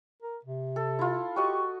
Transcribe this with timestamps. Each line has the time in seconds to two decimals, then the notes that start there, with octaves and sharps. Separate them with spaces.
0.23 A#4
0.45 C3
0.76 A4
0.99 E4 F4
1.36 F#4 G4 D#5 C#6